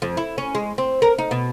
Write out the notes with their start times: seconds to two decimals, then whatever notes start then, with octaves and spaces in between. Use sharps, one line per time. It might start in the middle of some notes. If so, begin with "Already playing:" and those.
0.02 F2
0.17 E4
0.38 C#4
0.55 G#3
0.78 C4
1.02 A#4
1.18 D#4
1.31 B2